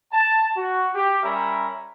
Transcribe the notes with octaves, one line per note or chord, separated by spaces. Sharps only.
A5
F#4
G4
G3 C#4 A#4 E5 A#5 B5